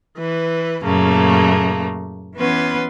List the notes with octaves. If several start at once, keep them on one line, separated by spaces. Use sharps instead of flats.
E3 B4
F#2 A#2 C#3 A3 A#3
E3 B3 C#4 B4 C6